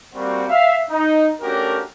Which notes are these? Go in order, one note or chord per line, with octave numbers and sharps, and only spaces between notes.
G3 A#3 C4 F#4
E5 F5
D#4
A3 C#4 D4 F#4 G4 A#4